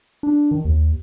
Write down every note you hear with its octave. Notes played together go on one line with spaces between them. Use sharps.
D4
D#3
D#2